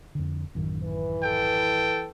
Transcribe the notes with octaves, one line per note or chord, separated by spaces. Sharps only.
F2 D3
A1 F#2 D#3
E3 B4
A4 G5